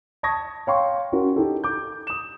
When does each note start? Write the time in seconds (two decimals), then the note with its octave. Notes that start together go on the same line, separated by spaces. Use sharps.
0.23 A5 C#6 D#6 G#6 A#6
0.67 C#5 F5 G5 C6 C#6
1.12 C#4 F#4 A#4
1.36 D#4 G4 A4
1.64 D6 G6
2.07 D#6 E7